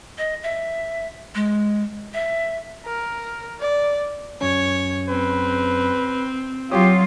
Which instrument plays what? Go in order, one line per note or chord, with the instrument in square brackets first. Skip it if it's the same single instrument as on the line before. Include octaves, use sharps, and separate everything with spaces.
[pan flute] D#5
E5
G#3
E5
[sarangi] A#4
D5
[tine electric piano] F#2 F#3 C#4 [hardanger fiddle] C#5
[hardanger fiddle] C4 [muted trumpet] B4
[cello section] F#3 F4 [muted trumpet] G4 [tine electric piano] C#5 D#6